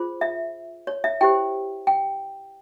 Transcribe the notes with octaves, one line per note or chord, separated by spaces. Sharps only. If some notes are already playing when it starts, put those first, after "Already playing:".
Already playing: F4 G#4 C5
E5
C#5
E5
E4 G4 C5 G5
G5